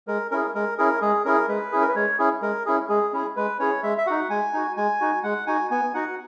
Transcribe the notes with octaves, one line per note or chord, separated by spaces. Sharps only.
G#3 A#4
C#4 E4 G#4 A#4
G#3 A#4
C#4 E4 G#4 A#4
G#3 G#4
C#4 E4 G#4 A#4
G#3 B4
C#4 E4 G#4
A#4
B4
G#3 C#5
C#4 E4 G#4
G#3 A#4
C#4 E4 G#4
G#3 G#4
C#4 E4 G#4
G#3 B4
C#4 E4 G#4 C#5
G#3 E5
E5
D#4 F#4 F#5
G#3 G#5
D#4 F#4
G#3 G#5
D#4 F#4
G#3 F#5
D#4 F#4 G#5
B3 G#5
D#4 F#4 F#5